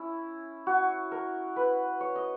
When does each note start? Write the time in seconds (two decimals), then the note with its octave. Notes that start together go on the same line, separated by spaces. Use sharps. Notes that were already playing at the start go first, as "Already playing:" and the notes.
Already playing: C#4 E4
0.67 F#4
1.12 A#4
1.56 B4
2.01 C#5
2.16 D#5